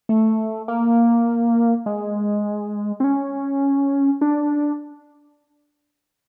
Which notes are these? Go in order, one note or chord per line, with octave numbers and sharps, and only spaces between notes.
A3
A#3
G#3
C4
C#4
D4